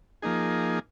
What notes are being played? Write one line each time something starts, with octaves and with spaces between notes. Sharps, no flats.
F3 A#3 D#4 G#4